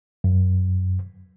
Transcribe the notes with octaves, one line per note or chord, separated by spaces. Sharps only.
F#2